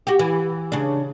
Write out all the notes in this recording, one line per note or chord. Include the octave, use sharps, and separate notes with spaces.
F#4 G4
E3
C#3 D4